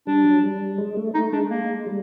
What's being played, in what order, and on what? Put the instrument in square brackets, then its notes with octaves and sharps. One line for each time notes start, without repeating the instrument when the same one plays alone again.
[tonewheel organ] G3 [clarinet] D4
[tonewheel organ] F#3
G3
G#3
A3
[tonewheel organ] A3 [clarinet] D#4
[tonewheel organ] G#3 [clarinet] D4
[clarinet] A#3
[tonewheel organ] G3